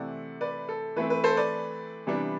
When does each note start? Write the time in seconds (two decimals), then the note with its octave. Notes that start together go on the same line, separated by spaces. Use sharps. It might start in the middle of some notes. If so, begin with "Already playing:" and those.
Already playing: C3 E3 A3 C4 D5 F#5
0.41 B4 D5
0.69 A4
0.96 E3 A3 C4 B4
1.10 B4
1.24 A4 C5
1.37 B4 D5
2.07 C3 E3 G3 B3 D4